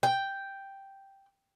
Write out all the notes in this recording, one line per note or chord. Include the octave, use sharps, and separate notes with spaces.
G5